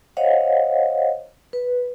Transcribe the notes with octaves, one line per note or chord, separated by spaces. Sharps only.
C5 C#5 D#5 F5 F#5
B4